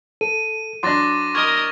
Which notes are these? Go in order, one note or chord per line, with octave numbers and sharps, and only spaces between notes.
A4 D#7
F#3 D4 C6 D6 A6 A#6
A#4 D#5 C#6 G#6